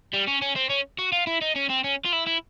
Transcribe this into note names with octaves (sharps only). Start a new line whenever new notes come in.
G3
C#4
C#4
C4
C#4
F#4
F4
E4
D#4
C#4
C4
C#4
F4
E4
E4